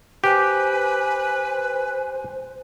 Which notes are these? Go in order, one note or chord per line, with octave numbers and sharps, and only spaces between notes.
G4 B4 C5 G#5